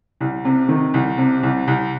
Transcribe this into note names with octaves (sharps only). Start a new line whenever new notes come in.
C2
C3
D#3
C2
C3
C2
C2